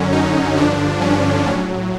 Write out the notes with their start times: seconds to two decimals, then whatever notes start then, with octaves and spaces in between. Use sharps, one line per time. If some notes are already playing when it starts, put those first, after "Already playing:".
Already playing: F#2 D3 F#3 C#4
0.12 D#4
0.57 G2 D3 F3 D4
1.01 C#4
1.46 A2 F#3